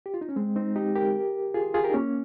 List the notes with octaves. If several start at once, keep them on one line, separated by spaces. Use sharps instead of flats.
G4
F4
D#4
C#4
G#3 C4
C4 D#4
D#4 G4
G4 A#4
F4 G#4
F4 G#4
G4 A#4
D#4
A#3 C#4